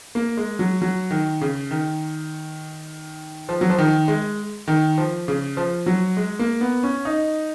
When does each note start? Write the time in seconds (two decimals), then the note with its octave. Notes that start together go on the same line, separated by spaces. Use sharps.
0.15 A#3
0.37 G#3
0.59 F#3
0.82 F#3
1.10 D#3
1.41 C#3
1.71 D#3
3.49 F3
3.61 F#3
3.70 F3
3.78 D#3
4.08 G#3
4.68 D#3
4.98 F3
5.28 C#3
5.57 F3
5.86 F#3
6.17 G#3
6.39 A#3
6.61 B3
6.83 C#4
7.05 D#4